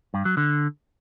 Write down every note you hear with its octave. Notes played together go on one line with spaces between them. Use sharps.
G2
F#3
D3